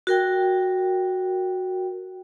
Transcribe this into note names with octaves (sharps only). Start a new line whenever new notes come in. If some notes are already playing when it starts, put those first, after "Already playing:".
F#4 A#4 G5